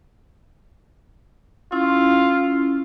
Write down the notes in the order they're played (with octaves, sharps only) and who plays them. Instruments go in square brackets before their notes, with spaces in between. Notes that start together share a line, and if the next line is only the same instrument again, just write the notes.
[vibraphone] C#4 E4 [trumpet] F4